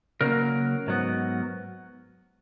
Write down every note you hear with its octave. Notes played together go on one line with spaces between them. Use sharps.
C#3 F#3 A#3 A#4
G#2 F#3 B3